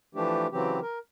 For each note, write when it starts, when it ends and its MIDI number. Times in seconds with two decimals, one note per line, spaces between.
0.15 0.47 52
0.15 0.47 53
0.15 0.47 57
0.15 0.47 62
0.15 0.47 67
0.52 0.80 49
0.52 0.80 52
0.52 0.80 54
0.52 0.80 60
0.52 0.80 67
0.82 0.99 70